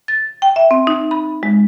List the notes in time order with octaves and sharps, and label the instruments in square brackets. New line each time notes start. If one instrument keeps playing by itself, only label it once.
[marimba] A6
G5
E5
C4
D#4
B5
G#3